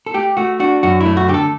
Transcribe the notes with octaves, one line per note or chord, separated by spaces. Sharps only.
A4
A3 G4
A3 F#4
D4 F#4
F#2 F#4
E4
A3
F#4
D3 G4
A4